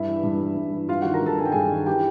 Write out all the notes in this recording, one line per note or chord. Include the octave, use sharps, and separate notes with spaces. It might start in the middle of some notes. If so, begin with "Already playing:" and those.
Already playing: G2 E4 E5
E3
G2
E3
G2
E3
G2 F4 F5
D#3 F#4 F#5
A#4 A#5
G2 A4 A5
D#3 G#5
G5
G2 G#4 G#5
D#3
E3 G4 G5